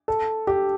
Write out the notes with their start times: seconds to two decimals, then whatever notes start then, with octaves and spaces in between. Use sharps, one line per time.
0.08 A4
0.47 G4